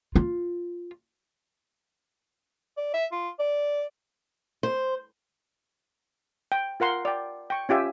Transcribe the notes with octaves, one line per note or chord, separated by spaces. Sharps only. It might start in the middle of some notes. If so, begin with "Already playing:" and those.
F4
D5
E5
F4
D5
C5
G5
F4 A#4 F#5 C6
D5 G5
G5 C#6
C#4 F4 G4 E5 G#5